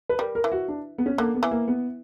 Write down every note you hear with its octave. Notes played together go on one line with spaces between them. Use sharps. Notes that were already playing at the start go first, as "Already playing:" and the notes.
B4
G3 A#4
A#4
E3
F#4
D4
B3
C#4
D3 A#3
B3
E3
A#3
B3